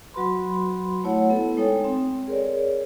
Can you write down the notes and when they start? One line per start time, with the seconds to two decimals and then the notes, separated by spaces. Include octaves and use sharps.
0.14 F#3 F#4 B4 B5 C6
1.04 A3 E4 C#5 F#5
1.30 B3 A4 B4
1.57 G#3 D#4 A4 C#5 G5
1.84 C4
2.27 G#4 A#4 C#5 D5